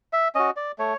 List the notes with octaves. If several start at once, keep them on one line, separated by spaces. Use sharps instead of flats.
E5
C#4 F#4 D#5
D5
A3 C#5